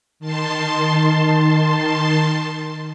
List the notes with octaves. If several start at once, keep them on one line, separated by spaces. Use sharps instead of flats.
D#3 A5 C6